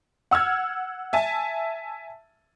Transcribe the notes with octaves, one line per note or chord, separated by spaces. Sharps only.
F#5 E6 F6 G#6
E5 G#5 A5